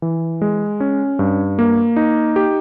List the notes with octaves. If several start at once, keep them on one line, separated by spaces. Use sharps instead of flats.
E3
G#3
C#4
G2
A#3
D#4
G4